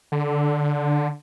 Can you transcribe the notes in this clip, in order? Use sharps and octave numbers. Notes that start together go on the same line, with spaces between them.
D3